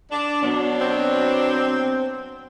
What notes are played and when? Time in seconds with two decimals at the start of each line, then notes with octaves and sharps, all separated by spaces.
0.12 D4
0.43 B2 F#3 D4
0.81 C4